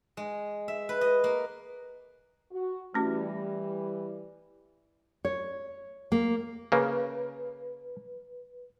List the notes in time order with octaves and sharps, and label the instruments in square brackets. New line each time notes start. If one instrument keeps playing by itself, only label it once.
[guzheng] G#3
E5
B4
D#5
A#3
[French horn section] F#4
[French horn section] E3 G3 [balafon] A3 C#4 F#4
[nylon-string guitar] C#5
A#3
[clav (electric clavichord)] C#3 A#3 [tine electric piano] B4